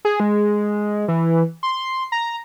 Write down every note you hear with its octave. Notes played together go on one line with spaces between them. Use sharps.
G#4
G#3
E3
C6
A#5